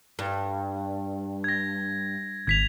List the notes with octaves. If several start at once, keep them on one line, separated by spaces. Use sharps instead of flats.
G2
G#6 A#6
G#1 G#6 B6 F7